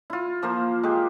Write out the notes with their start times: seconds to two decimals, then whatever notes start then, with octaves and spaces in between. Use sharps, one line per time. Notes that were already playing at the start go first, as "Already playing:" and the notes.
0.10 E4 F4
0.42 F3 A#3 C5
0.83 G#3 G4